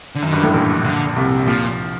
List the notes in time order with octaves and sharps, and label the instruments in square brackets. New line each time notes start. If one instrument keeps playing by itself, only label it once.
[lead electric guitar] D3
[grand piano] F#2 [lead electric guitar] D#3
[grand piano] G1 G2
A1 A2
A#1 A#2
[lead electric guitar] D3
[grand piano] C2 C3
[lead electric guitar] A#2 [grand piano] F3